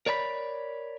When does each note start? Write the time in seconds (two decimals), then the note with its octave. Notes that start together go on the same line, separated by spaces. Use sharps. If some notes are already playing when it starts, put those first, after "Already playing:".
0.06 A#4 C#5 D5 A#5 B5